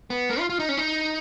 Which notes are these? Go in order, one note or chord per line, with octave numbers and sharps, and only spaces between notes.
B3
A#3
F4
F4
D#4
C#4
D#4